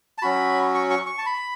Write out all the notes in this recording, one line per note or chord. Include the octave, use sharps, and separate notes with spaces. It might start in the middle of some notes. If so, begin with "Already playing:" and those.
A5
F#3 C#4 F#4 B5
C#6
C#6
C#6
A5
B5